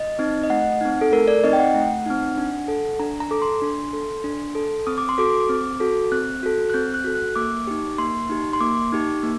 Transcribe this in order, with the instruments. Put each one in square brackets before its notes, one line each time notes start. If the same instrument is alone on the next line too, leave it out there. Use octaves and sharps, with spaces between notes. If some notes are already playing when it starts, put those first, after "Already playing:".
Already playing: [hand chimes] D#5
C4 D#4
D#5
A3 F#5
C4 D#4
A4
A3 A#4
D5
C4 D#4 D#5
G5
F#5
A3
C4 D#4
D4
A4
D4 A#5
A#5
A4 D6
C6
D4
A4
D4
A4
C4 D#6
D6
C6
F#4 A4 D6
C4
F#4 A4
C4 F#6
F#4 A4
F#6
C4 G6
F#6
F#4 A4
F#6
A#3 D6
D#4 G4
A#3 C6
D#4 G4
C6
A#3 D6
D#4 G4
A#3